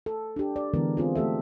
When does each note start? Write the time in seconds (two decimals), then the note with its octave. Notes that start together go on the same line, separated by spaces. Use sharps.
0.06 A4
0.36 D4 G4
0.56 D5
0.74 D3 E3 G#3 B3 A#4
0.97 C4 F4 G#4
1.15 A3 G4 A4 E5